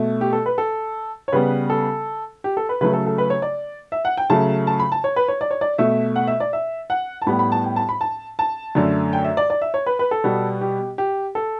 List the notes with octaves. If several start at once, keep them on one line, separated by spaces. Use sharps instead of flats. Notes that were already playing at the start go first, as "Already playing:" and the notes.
Already playing: B2 A3
G4
A4
B4
A4
C#5
C#3 G3 B3 B4
A4
G4
A4
B4
C#3 F#3 A3 B4
A4
A4
B4
C#5
D5
E5
F#5
G5
C#3 F#3 A3 A5
A5
B5
A5
C#5
B4
C#5
D5
C#5
D5
B2 A3 E5
F#5
E5
D5
E5
F#5
A5
A2 G3 B3 B5
B5
A5
G5
A5
B5
A5
A5
F#2 D3 A3
G5
E5
D5
D5
E5
C#5
B4
B4
A4
B2 G3 B3
G4
G4
A4